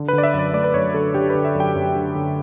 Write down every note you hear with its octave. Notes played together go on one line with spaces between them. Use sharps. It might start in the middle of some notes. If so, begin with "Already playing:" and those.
Already playing: D3
B4
D3
D5
E5
F#2 D5 E5
A3 D5
B4
F#2 C#5
D3 A4
D3 G4
B4
D3
E5
F#2
G5
F#2
D3
D3